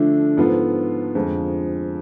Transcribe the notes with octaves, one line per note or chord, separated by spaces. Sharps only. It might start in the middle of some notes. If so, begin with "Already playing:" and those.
Already playing: D3 F3 A3 D4
G#2 F3 B3 F4 A4
F2 D3 F3 G#3